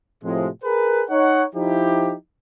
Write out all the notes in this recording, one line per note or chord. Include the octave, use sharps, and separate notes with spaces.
A2 C3 F3 G#3
G#4 A#4 B4
D#4 C#5 F#5
F3 D#4 E4 G4